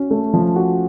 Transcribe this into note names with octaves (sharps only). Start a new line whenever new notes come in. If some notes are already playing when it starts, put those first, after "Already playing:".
Already playing: C#4 F#4
A3
F3
F#4